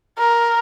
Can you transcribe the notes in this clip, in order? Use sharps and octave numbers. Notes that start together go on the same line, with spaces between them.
A#4